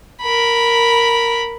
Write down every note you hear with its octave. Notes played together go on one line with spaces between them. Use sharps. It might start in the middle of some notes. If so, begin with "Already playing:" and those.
A#4 B5